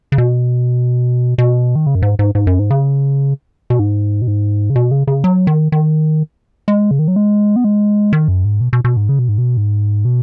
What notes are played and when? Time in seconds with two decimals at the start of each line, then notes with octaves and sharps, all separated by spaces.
0.12 C#3
0.18 B2
1.38 B2
1.76 D#3
1.86 C#3
1.95 F#2
2.02 G#2
2.19 G#2
2.35 G#2
2.47 F#2
2.59 G#2
2.70 C#3
3.70 B2
3.79 G#2
4.22 B2
4.28 G#2
4.70 C#3
4.76 B2
4.91 C#3
5.07 C#3
5.24 F#3
5.47 D#3
5.72 D#3
6.68 G#3
6.91 C#3
6.99 D#3
7.08 F#3
7.16 G#3
7.56 B3
7.64 G#3
8.13 D#3
8.28 F#2
8.45 G#2
8.61 B2
8.73 B2
8.84 B2
8.97 G#2
9.09 C#3
9.19 B2
9.29 G#2
9.38 B2
9.57 G#2
10.05 B2